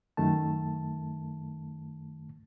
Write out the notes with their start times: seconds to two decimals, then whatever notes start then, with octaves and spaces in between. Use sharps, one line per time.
0.17 F#2 D#3 A3 A5